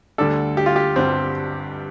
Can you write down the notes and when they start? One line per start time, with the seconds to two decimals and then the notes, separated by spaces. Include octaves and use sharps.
0.18 D2 D3 G3 D4 A4
0.57 G4
0.66 F4
0.76 G4
0.96 G1 G2 D3 G3 C4